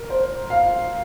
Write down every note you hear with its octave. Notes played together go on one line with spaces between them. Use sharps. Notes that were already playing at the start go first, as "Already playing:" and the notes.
Already playing: A#4
C5
F5